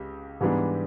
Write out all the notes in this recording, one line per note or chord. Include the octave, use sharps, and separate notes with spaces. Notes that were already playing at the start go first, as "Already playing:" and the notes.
Already playing: C#2 G4
G#2 E3 G3 B3 D4